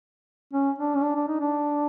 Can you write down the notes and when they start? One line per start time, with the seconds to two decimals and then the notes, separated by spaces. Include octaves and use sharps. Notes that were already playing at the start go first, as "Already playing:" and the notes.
0.53 C#4
0.78 D4
0.95 C#4
1.03 D4
1.15 D4
1.28 D#4
1.40 D4